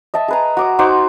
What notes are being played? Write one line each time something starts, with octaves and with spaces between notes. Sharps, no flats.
D#5 E5 A5
G#4 B4 A#5
F#4 D6 D#6
D#4 F#4 C5 D6